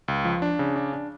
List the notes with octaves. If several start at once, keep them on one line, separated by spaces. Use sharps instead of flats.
C#2
F3
D4
C#3
D4
D4